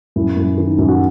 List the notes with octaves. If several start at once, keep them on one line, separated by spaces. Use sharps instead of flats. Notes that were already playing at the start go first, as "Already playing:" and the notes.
F#2 E4
F#2
D#3
F#2
F#4